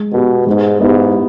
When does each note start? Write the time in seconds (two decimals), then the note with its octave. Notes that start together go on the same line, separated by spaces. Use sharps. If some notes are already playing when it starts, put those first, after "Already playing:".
Already playing: G#3
0.12 B2 B3 G4
0.47 G#2 G#3
0.80 G#2 B3 E4 G4